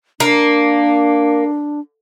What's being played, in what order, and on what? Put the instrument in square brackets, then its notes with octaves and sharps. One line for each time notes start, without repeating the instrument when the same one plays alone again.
[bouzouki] A#3 [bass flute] D4